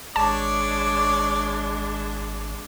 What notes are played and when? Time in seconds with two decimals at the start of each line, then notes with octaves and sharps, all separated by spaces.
0.16 G#1 G#3 D4 C#5 D5 A5 D6